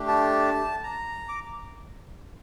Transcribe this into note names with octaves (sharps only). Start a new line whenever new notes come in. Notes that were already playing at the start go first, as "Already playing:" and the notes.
Already playing: A3 D4 G4
A5
A#5
D6